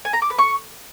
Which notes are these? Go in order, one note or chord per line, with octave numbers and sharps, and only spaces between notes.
G#5
A#5
D6
B4
C#6